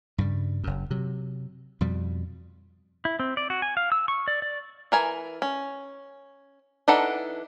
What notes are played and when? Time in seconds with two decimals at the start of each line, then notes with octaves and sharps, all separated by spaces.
0.18 G2 C#3 G3
0.64 F#1 F#2
0.91 C3 F#3
1.81 F2 B2 G3
3.05 E4
3.20 C4
3.37 D5
3.50 F#4
3.62 G#5
3.77 F5
3.92 E6
4.08 C#6
4.28 D5
4.42 D5
4.92 E3 A#4 G#5
5.42 C#4
6.88 E3 D4 D#4 A4 F#5